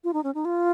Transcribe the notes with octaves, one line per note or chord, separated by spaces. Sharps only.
F4
D#4
C#4
D#4
F4